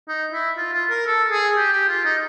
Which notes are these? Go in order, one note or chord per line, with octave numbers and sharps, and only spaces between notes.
D#4
E4
F4
F4
A#4
A4
G#4
G4
G4
F4
D#4